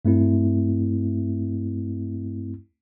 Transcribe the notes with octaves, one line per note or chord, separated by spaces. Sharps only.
G2 A3 C4 E4